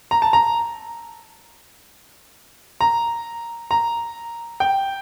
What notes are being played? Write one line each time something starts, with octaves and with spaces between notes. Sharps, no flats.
A#5
A5
A#5
A#5
A#5
G5